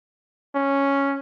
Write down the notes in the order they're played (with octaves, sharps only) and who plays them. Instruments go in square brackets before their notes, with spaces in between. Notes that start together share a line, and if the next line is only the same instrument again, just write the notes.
[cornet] C#4